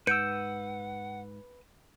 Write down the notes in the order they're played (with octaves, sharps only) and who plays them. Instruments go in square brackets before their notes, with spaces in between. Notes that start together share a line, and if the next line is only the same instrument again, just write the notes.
[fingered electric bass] G#2 [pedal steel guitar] B4 E6 [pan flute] F#5 [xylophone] G6 C#7 D7